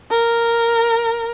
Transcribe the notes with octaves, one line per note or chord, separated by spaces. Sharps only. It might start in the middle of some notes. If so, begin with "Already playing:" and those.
A#4